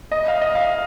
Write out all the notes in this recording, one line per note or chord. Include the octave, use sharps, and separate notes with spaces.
D#5
F5
D#5
F5